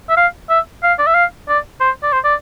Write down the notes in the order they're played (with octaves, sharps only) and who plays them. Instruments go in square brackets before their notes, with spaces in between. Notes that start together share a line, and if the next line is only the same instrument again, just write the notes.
[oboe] E5
F5
E5
F5
D5
E5
F5
D5
C5
D5
C5
D5